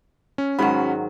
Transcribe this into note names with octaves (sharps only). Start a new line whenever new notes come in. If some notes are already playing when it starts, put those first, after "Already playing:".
C#4
G#2 D#3 F#3 C#4 F#4 B5